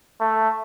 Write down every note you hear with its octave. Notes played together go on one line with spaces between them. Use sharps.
A3